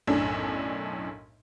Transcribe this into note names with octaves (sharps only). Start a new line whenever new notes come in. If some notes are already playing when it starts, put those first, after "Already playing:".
B1 F#2 A2 D4